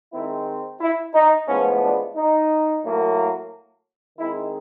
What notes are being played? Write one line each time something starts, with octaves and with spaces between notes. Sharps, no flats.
D#3 G#3 C4 E4
E4
D#4
A2 F3 G#3 B3 C#4
D4
D#4
A2 F#3 A#3
D#3 G#3 C4 E4